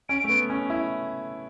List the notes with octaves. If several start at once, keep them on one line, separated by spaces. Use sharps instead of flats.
C#4 D7
A3
B3
C#4
E4